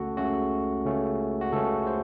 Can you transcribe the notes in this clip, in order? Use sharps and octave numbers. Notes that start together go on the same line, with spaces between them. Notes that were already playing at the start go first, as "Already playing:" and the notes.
Already playing: C#2 C#3 A3 C#4 F#4 A4
C#2 C#3 A3 C#4 F#4
C#2 C#3 A3 C#4
F#4
C#2 C#3 A3 C#4 A4
C5